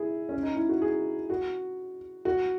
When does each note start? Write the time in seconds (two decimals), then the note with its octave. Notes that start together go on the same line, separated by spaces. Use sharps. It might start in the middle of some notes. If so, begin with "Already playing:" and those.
Already playing: E4 G#4
0.29 C#4
0.43 D#4
0.55 E4
0.69 F#4
0.82 G#4
1.30 F#4
2.25 F#4